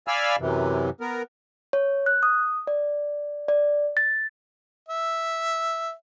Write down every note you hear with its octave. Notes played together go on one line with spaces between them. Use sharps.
D5 F5 G#5 B5 E6 F6
F#2 C3 E3
B3 A#4
C#5
F#6
D#6
D5
D5
A6
E5